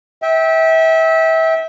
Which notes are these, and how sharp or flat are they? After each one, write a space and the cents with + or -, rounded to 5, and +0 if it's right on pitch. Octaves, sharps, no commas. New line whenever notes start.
E5 -25 G5 +0